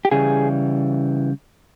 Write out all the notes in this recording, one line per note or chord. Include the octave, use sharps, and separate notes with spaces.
G4
C#3 E3 G3 G#4